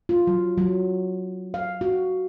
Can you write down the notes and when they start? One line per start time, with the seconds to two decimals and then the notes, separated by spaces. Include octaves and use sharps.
0.09 F4
0.27 F#3
0.58 F#3
1.54 F5
1.81 F#4